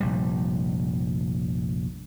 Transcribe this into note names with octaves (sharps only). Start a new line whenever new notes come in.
F1 A#1 G3